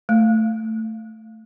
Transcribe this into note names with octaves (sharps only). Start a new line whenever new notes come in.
A3